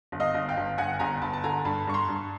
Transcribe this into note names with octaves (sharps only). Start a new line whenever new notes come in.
G1
D#5 F5
G1
F5 G5
G1
G1 F#5 G#5
G1 G#5 A#5
G1 A5 B5
A5
D3 G#5 A#5
G2 A5 B5
G2 C#6
A#5 C6
G2